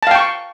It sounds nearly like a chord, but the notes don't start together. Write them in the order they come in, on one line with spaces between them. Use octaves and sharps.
A5 F5 G5 C#6